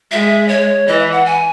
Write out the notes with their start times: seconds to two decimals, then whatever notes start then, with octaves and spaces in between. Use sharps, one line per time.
0.11 G#3 E5
0.48 C#5
0.87 E3 D#5
0.99 E5
1.12 F#5
1.26 G#5